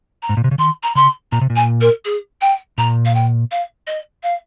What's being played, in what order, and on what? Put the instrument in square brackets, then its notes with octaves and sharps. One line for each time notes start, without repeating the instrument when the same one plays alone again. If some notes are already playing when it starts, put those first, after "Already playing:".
[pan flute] A#5
[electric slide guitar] G#2
A#2
C3
C#3
[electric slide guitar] D#3 [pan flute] C6
[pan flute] A#5
[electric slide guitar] C#3 [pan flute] C6
[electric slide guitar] A#2 [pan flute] A#5
[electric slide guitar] C3
A#2
[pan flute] G#5
A#4
G#4
G5
[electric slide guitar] A#2 [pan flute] A#5
[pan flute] F5
G5
F5
D#5
F5